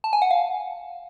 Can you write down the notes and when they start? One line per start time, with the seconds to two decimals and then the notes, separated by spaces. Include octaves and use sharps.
0.04 A5
0.13 G#5
0.22 F#5
0.31 F5